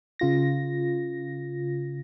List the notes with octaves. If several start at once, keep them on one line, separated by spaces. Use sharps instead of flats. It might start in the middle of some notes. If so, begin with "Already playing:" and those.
C#3 F4 A#6